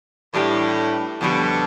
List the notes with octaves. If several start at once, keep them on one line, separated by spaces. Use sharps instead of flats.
A2 E3 G3 D4 G4
F2 B2 D3 G3 D4